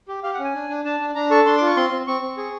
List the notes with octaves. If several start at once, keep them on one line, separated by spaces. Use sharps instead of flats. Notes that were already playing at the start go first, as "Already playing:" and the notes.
G4
G4 F5
F#5
C#4
G#5
D4
D4
D4 A5
D4
D4 A#5
A4 C#6
D4 C6
F4 D6
C#6
C4 C6
C4
C4 C#6
C4
G#4